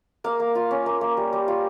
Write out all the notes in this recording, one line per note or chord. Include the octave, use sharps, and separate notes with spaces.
A#3 F5
A#3
F4
C#4
A#3
A#3
G3
G3
F4